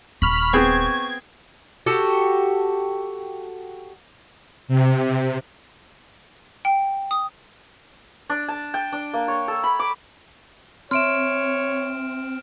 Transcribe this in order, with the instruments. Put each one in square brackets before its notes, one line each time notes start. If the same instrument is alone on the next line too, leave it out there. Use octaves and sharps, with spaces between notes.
[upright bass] D#1 [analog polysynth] B5 F6 [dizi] C#6
[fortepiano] B3 C4 G#4 [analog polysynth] G#6
[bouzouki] F#4 G4 A4
[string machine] C3
[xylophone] G5
D#6
[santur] D4
A5
G5
D4
A#3
C#5
A4
B5
D6
[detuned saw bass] C4 [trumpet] C#5 [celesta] E5 C6 [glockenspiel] F6 D7 E7